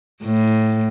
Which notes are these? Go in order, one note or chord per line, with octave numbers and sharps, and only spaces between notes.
A2